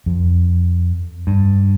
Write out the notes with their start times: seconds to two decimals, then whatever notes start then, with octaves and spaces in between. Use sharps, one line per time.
0.06 F2
1.27 G2